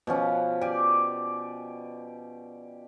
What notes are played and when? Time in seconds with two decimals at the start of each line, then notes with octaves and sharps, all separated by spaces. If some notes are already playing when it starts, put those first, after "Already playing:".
0.07 B2 F3 C#4
0.61 G4 D5 G#5